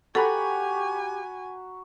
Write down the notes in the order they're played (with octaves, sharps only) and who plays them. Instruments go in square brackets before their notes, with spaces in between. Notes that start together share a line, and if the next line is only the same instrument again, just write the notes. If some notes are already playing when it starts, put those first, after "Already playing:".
[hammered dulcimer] F#4 A#5 B5 [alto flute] G4 [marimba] A4 [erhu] G#5